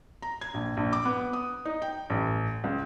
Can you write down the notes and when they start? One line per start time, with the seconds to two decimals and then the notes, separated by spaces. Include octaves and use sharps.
0.22 A#5
0.41 G#6
0.54 A#1
0.77 A#1
0.93 D6
1.05 B3
1.33 D#6
1.65 D#4
1.82 G5
2.10 A1
2.64 C#2